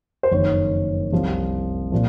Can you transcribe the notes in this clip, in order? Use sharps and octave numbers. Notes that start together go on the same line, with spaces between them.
C5
F#1 F2 D#3 C#5
C2 C3 F3
A#2 F3